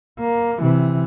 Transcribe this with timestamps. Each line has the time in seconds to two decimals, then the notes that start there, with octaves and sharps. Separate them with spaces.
0.20 A#3
0.60 C3 E3